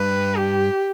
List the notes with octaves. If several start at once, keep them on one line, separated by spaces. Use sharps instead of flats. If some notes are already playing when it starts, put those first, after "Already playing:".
Already playing: G2 B4
G4